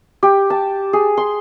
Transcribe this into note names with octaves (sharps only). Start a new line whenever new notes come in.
G4
A5
G#4
C6